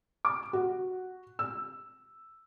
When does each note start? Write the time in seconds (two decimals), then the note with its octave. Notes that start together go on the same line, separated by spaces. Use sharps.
0.25 D6
0.53 F#4
1.39 E6